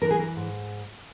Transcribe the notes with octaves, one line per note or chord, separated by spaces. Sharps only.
E3 A#4
G#4
A#4
G#2